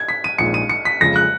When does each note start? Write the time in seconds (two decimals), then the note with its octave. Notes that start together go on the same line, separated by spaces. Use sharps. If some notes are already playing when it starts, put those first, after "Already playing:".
Already playing: G#6
0.08 B6
0.24 D#7
0.38 A#1 A#2 G#3 D#4 C#7
0.54 D#7
0.69 C#7
0.85 B6
1.00 F#1 F2 C#3 F3 G#3 A#6
1.16 F#6